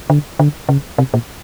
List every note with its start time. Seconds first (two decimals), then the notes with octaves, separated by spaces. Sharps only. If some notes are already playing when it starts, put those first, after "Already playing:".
0.10 D3
0.39 D3
0.69 C#3
0.98 C3
1.14 A#2